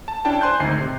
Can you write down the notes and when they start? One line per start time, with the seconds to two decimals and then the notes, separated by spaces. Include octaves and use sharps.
0.08 A5
0.25 C#4 D4 E4 G5 A5
0.41 C5 G#5 C6 F#6 G6
0.60 G#1 D2 D#4 C7
0.80 C3